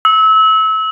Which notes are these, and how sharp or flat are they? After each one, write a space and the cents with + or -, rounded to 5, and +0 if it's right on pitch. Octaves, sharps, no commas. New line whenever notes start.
E6 -30